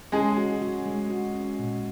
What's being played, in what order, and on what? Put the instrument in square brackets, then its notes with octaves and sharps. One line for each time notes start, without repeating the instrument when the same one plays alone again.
[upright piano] G#3 G#4 [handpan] C#4
[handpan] F#4
F#4
G#3
F#4
C#4
A#2